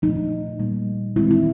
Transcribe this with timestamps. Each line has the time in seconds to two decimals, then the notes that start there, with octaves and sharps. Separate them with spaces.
0.02 A#2 F3 A3 D#4
0.60 A#2 G3 A#3
1.16 D#3 G#3 C4 D#4 E4
1.31 E4